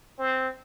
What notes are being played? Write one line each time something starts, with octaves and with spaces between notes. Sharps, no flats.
C4